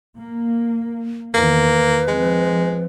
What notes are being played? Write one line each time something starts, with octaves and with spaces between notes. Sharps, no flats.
A#3
E2 D#3 A#3 B4
F3 G#3 C4